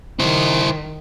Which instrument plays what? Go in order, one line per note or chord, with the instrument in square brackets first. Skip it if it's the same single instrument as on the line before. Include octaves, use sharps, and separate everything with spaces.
[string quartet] D#3 [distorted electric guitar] E4 C5